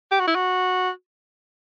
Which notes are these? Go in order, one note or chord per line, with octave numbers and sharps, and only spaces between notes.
G4
F#4
E4
F#4